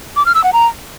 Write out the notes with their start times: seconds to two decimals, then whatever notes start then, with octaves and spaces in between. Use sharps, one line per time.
0.16 D6
0.26 F6
0.35 E6
0.44 F#5
0.53 A#5